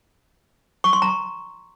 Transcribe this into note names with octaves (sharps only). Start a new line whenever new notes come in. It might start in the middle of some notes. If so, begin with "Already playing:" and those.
C#6
C6
A#5